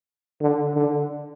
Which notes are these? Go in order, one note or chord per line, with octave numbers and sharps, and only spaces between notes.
D3
D3